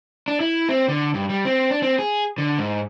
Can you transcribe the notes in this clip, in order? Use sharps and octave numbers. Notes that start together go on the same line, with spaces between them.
D4
E4
C4
D3
G2
G3
C4
D4
C4
G#4
D3
G#2